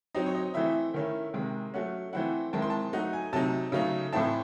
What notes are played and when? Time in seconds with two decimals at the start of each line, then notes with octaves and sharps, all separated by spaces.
0.15 F#3 C4 D#4 D#5
0.26 C#5
0.35 D#5
0.54 E3 A3 C4 E4 E5
0.94 D#3 A3 C#4 E4
1.34 C3 D#3 G#3
1.74 F#3 A3 C#4 F#5
2.13 E3 A3 C4 E4 F#5
2.53 D#3 G#3 C4 E4 A5
2.62 C6
2.70 A5
2.93 F#3 A3 D#4 F#5
3.13 G#5
3.33 C3 F#3 A3 D#4 A5
3.72 C#3 F#3 A3 D#4
4.13 A2 E3 A3 C4 E4 A5